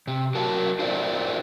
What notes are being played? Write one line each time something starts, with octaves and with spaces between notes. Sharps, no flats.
C3
F#3 A#4 A5
D#4 F4 A#4 C5 D5 E5